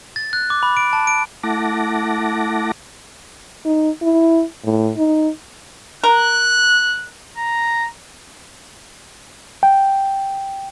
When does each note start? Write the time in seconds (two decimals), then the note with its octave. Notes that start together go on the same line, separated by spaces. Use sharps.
0.16 A6
0.33 F#6
0.50 D6
0.63 B5
0.77 D7
0.93 A5
1.07 D7
1.43 A3 E4 F#5 A5 D6 A#6
3.65 D#4
4.02 E4
4.65 A2
4.97 D#4
6.04 A#4 F#6
7.37 A#5
9.63 G5